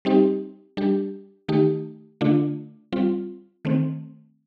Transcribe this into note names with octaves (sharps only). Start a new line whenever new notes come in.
G3 C4 D#4 G4
G3 D4 G4
D#3 A3 D#4 G4
D3 A3 D4 F4
G3 C4 F4
D#3 A3 C4